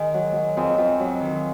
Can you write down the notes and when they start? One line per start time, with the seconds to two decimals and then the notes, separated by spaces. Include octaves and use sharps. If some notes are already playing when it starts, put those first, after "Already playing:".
Already playing: D#3 G#3
0.14 F#3
0.35 F#3
0.57 F2 G#3
0.78 F2
1.00 F#3
1.21 D#3